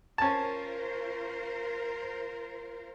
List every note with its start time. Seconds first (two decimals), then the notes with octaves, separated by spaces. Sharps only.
0.18 C#4 F4 A#4 C5 A5